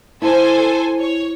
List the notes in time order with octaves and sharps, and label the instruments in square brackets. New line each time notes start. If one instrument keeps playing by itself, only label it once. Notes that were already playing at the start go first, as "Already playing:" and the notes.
[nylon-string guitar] E4 [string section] A4 C5 G#5
[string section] C#5